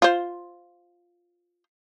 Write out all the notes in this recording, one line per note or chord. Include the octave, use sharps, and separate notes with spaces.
F4 C5